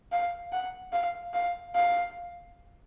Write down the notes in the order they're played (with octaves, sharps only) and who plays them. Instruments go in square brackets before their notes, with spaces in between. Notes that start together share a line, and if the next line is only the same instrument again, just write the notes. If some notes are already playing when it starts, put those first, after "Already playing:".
[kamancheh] F5
F#5
F5
F5
F5